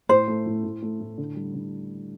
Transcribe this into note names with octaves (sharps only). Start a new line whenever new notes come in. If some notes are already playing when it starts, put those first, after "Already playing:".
A2 C5
A3
A2
A2
A3
A2
D3
G3
D3